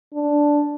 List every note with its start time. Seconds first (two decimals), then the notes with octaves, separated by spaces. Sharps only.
0.13 D4